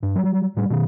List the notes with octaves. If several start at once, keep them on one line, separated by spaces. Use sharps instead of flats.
G2
F#3 G3
A2 G3
B2 D#3